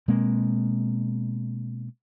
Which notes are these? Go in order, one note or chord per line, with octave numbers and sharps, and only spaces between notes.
B2 G#3 A#3 C4